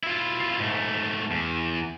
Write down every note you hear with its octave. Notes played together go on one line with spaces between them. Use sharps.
E4 F4
G#2 A3
E2